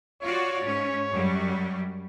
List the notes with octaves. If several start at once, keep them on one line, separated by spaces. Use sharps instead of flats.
F4 F#4 C#5 D5
G#2 C#4
F#2 F#3 G3